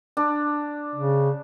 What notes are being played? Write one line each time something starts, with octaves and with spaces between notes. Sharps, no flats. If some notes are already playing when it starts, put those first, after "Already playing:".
D4
C#3